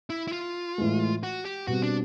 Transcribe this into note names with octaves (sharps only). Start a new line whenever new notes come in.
E4
E4
F4
A2 E3 G#3
F#4
G4
B2 G3 C4 F#4
D4